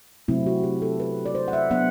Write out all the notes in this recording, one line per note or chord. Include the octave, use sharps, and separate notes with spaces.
C3 F#3 A3 C4 E4
F#4
G4
A4
B4
D5
C5
F#5
E5
F#3 B3 D4 F#5